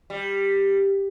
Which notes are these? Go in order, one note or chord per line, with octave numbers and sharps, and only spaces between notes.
G3